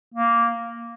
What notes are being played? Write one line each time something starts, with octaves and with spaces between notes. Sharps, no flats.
A#3